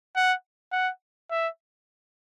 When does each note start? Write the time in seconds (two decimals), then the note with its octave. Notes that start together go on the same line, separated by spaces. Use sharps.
0.16 F#5
0.72 F#5
1.31 E5